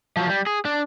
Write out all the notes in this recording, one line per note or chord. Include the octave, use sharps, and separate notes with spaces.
F3 F#3
G3
G#4
D4